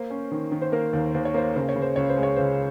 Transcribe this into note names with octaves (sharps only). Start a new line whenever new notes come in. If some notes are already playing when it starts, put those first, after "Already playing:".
Already playing: A#3 C5
C#4
D#3
D#3
C5
A#3 A#4
D#2
D#2 C5
C#5
A#3 C5
C#3 C5
C#5
C#3
C5
C#2 C#5
C5
G#3
C#5
C#2 C5